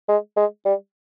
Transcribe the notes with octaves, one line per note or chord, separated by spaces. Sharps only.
G#3
G#3
G3